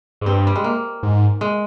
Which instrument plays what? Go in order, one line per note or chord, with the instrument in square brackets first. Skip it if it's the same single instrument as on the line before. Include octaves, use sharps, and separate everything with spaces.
[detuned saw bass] G#2
[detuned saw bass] G2 [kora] C4
[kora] G3
G#3
A#3
[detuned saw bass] G#2
[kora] G#3